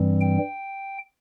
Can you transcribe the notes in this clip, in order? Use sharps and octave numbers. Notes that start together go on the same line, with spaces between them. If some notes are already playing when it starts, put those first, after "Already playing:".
Already playing: G2 E3 G3 C4
G5